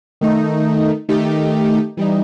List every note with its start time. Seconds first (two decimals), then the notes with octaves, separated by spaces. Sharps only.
0.21 D#3 A3 D#4
1.09 D#3 A3 D#4 G4
1.97 E3 G3 D#4